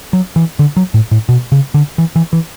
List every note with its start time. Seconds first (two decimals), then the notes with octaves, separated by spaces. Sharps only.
0.13 F#3
0.36 E3
0.59 D3
0.77 F#3
0.94 A2
1.11 A2
1.29 B2
1.52 C#3
1.74 D3
1.98 E3
2.16 E3
2.33 E3